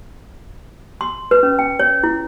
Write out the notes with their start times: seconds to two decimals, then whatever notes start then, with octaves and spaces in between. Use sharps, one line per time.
1.01 C6
1.31 B4
1.43 C#4
1.59 G5
1.79 C#5
2.03 E4